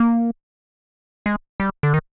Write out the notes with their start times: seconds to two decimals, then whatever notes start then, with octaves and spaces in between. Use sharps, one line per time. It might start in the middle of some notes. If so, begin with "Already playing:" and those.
Already playing: A#3
1.26 G#3
1.60 G3
1.83 D3
1.94 D#3